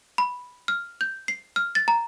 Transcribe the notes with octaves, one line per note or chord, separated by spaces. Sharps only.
B5
F6
G6
C7
F6
A6
A#5